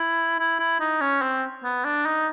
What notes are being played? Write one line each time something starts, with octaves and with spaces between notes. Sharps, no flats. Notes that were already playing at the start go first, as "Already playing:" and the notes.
Already playing: E4
E4
E4
D#4
C#4
C4
B3
D4
D#4